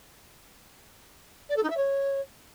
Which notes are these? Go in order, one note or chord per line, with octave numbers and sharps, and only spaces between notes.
D5
A4
D#4
E5
C#5